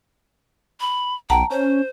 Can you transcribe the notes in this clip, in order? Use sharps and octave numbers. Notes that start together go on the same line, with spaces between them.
B5
B1 F#5 G5 A5 A#5
C#4 C5